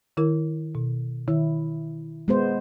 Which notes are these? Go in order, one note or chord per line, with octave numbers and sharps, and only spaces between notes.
D#3 E4 A#4
B2
D#3 E4
G#3 B3 C5